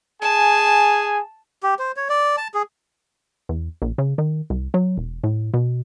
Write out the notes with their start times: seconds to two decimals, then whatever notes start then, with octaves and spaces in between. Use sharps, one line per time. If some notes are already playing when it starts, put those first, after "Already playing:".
0.22 G#4 G#5 A5
1.63 G4
1.79 C5
1.96 C#5
2.09 D5
2.37 A5
2.54 G#4
3.49 E2
3.82 A#1
3.98 C#3
4.18 D#3
4.50 C2
4.74 F#3
4.97 E1
5.24 A2
5.54 B2